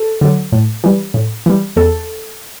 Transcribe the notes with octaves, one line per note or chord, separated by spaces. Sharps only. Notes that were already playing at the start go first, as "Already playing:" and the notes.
Already playing: A4
D3 F#3
A2
E3 G3
A2
E3 G3
E2 A4